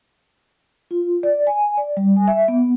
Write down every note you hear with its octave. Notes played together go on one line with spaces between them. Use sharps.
F4
D5
G#5
D5
G3
G#5
E5
B3